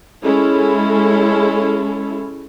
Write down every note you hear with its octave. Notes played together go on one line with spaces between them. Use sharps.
G#3 C#4 E4 A4